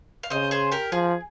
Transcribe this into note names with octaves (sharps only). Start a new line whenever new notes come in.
F5
C#3 C5 D#5
G#4 C5
G4 A#4
F3 G#4